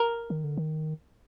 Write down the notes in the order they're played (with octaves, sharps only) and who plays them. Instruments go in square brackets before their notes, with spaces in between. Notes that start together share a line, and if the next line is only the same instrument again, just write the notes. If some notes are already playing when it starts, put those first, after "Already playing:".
Already playing: [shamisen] A#4
[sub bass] D#3
D3
D#3